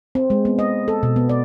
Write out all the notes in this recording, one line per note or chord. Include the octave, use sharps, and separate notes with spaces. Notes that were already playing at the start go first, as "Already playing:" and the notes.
C4
G#3
B3
D#5
A4
B2
B3
D5